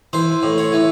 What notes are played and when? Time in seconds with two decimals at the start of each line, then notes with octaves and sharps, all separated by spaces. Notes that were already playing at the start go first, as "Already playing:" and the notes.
0.13 E3 C5
0.43 A2
0.58 C#5
0.73 E3